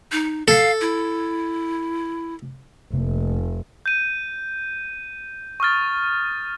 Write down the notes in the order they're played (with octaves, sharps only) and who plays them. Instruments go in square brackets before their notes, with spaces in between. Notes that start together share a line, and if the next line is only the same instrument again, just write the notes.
[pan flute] D#4
[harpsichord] A4 [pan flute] F5
[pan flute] E4
[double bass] F1 [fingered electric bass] C3 A3 A#3
[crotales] G6 D#7
C#6 D#6 F6 A6